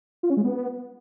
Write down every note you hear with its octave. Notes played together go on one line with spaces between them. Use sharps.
F4
C#4
G#3
B3